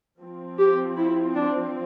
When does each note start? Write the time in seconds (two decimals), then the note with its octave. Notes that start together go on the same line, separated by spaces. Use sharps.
0.21 F3 C4
0.59 G4
0.97 E4
1.35 D4